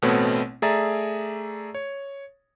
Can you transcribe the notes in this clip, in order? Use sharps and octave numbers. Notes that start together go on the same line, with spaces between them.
A1 B2 A3 B3 C4 C#5
A3 G#4 D5 E5 A#5 A6
C#5